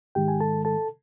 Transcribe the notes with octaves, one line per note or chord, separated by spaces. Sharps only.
G#2 D#3 G#3 G4 G5
G#5
A4 A5
A4 A5